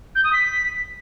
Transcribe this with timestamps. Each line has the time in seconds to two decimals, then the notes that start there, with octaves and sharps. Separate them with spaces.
0.15 G6
0.24 D#6
0.33 B6